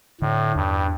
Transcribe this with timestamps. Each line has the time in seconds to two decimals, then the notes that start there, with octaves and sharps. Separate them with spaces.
0.21 A2 D3
0.56 E2 G2